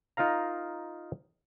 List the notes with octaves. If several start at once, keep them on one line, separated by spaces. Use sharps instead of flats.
D#4 F4 A#4 F5 A#5